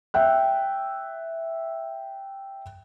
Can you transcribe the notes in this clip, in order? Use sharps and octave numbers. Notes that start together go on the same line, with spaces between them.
E5 G5 F#6